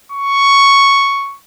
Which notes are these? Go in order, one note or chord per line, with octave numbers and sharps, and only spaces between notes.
C#6